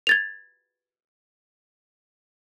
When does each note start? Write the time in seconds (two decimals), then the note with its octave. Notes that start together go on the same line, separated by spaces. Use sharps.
0.07 G#6 A6 F7